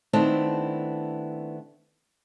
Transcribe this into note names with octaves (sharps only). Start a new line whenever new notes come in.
D#3 A3 B3 C4 D4 E4